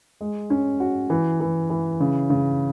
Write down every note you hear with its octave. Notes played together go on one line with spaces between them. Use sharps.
G#3
C#4
F#4
E3
E3
E3
C#3
C#3